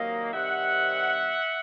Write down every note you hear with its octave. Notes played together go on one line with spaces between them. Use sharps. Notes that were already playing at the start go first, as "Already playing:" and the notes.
Already playing: C3 D#3 F#3 A#3 D#5 F5
C3 D#3 G3 C4 E5 F#5